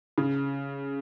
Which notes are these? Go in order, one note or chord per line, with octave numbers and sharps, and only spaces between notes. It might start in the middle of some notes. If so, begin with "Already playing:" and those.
C#3